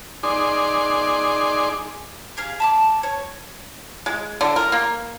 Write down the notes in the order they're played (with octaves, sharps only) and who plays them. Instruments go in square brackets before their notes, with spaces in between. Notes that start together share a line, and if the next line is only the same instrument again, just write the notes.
[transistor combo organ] D#4 G#4 D5 C6
[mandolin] G4 G#4 F5
A5 B5 D6
C#5
[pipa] G#3
D3
A#4
A#3